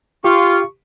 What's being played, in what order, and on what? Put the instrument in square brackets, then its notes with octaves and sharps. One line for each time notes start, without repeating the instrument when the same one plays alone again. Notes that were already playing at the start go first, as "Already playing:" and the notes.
[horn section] F4 [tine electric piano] G4 [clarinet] C#6